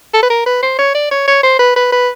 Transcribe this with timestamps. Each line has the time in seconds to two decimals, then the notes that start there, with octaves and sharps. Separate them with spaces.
0.13 A4
0.23 B4
0.30 A#4
0.46 B4
0.62 C5
0.79 C#5
0.94 D5
1.11 C#5
1.27 C#5
1.43 C5
1.59 B4
1.76 B4
1.92 B4